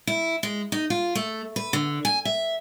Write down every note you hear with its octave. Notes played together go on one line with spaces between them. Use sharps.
E4
G#3
D#4
F4
A3
B4
D3
G#5
E5